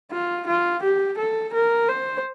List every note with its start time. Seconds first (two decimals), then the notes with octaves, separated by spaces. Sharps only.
0.12 F4
0.47 F4
0.83 G4
1.18 A4
1.53 A#4
1.88 C5